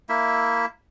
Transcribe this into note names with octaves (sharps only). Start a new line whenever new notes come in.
A#3 E4 E5